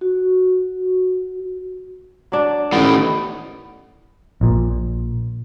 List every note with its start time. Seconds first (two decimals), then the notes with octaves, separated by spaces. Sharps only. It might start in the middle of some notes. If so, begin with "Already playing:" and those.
0.01 F#4
2.32 F#3 D4
2.72 A1 A2 D#3 B3
4.41 A#1 A#2